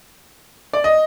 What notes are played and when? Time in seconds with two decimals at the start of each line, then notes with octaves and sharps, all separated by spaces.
0.73 D5
0.84 D#5